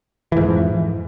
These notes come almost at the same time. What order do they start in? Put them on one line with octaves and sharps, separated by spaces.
E3 G#2 F2